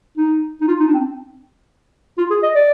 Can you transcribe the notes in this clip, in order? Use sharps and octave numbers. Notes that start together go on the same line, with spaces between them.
D#4
D#4
F4
D#4
D4
C4
F4
G#4
D#5
D5